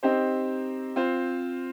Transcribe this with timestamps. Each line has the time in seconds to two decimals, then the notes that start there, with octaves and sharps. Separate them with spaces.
0.03 C4 D#4 G4 C5
0.96 C4 F4 C5